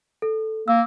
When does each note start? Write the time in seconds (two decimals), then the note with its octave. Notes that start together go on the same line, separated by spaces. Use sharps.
0.22 A4
0.68 A#3 E6